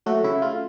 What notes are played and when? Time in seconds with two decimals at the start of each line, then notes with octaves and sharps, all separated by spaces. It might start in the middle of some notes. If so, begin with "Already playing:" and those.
0.06 F#3 A3 F#4
0.24 C#3 E4
0.42 A3 F4